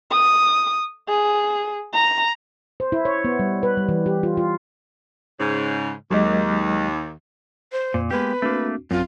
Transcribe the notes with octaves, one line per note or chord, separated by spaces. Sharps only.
D#6
G#4
A#5
C5
E4
C#5
B3
G3
B4
G3
E3
G4
F4
F4
G#2 C#3
D#2 F#3 G#3 D#5
C5
F2 A#2
G#3 A#3 B3 G4 B4
A3 A#3 C4 D4 F#4
A1 F#2 F#3 C4 F4